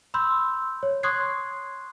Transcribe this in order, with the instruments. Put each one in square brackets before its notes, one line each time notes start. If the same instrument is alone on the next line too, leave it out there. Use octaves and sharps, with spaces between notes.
[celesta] B5 C6 E6 G6
C#5
C6 C#6 D#6 F#6 G#6 C7